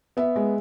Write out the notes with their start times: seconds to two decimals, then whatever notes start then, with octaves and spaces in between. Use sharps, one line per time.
0.17 B3 E5
0.36 G#3